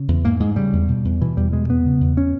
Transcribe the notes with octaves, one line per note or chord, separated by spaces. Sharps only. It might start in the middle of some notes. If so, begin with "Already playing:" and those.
Already playing: C#3
E2
G#2 A#3
G#2 G#3
C#3 G3
E2
B2
E2
B2 E3
E2 G3
B2 G#3
E2 B3
C#3
E2
C#4